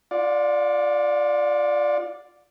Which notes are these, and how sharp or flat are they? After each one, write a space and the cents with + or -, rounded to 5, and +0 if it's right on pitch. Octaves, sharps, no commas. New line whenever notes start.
F4 +0 D5 +0 F#5 -45